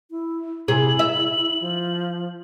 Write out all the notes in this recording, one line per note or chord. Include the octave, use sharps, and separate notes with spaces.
E4
C3 E4 G#4 F#7
E5
F3